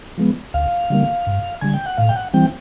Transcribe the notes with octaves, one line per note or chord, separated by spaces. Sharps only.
F3 G#3 B3
D2 F5
D3 G3 A#3
G2
D3 G3 G#5
G5
F#5
A2 F5
G5
F#5
E3 G3 C4 G5